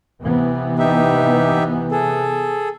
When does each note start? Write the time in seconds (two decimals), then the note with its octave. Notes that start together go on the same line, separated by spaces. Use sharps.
0.21 C3 E3 B3
0.79 D#4 G4 E5
1.91 G#4 A4